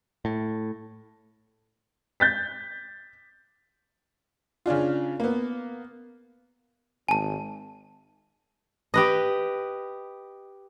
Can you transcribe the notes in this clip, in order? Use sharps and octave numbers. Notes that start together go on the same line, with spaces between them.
A2
G6 A6 B6
C#3 C#4 D4 F4
A#3 B3
G#1 G#5 A5
G4 B4 D#5